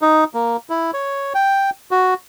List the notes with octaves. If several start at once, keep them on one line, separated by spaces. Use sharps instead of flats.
D#4
A#3
E4
C#5
G5
F#4